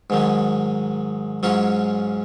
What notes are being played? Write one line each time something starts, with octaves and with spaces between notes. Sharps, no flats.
G#2 D#3 F#3
G#2 F#3 C#4 F4